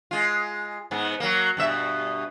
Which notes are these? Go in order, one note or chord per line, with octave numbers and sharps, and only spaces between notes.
G#3 F4
G#2 B3
F#3 A#3
G2 B2 E5